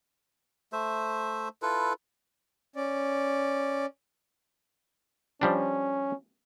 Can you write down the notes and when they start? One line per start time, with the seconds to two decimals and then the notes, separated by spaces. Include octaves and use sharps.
0.73 A3 C5 E5
1.62 E4 F4 A4 B4
2.76 C#4 D5
5.41 F3 G3 C#4 D4